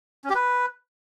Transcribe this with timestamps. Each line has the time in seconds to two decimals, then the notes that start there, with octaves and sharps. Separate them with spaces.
0.24 C#4
0.30 G4
0.35 B4